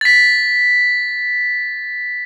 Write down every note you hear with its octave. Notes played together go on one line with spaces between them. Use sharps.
A6 B6